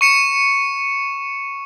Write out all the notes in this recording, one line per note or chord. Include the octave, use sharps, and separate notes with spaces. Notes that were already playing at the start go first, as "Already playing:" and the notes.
C#6 C#7 E7